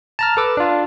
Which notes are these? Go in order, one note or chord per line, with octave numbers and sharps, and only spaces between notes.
A5 A#5 F6
A4 B4 D6 E6
D4 F4